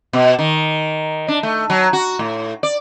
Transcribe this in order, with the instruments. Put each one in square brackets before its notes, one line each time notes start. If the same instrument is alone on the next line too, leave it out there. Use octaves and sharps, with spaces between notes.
[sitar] B2
D#3
D4
A3
F#3
F#4
A2
D5